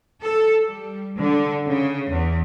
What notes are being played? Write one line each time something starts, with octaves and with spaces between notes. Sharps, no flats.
A4
G3
D3
C#3
E2